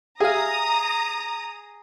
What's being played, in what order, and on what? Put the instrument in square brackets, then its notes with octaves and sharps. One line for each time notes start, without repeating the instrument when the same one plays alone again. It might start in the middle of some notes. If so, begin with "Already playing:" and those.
[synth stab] G4 E5 F5 [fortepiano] G#4 [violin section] A#5 D#6